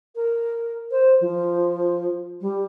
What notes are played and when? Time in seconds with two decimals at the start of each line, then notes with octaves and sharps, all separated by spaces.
0.15 A#4
0.90 C5
1.20 F3
2.40 G3